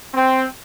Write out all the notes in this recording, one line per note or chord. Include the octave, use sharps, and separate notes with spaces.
C4